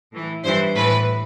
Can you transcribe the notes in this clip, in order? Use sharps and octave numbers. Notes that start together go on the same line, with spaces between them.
A2 E3
G2 E3 C5
A2 E3 B4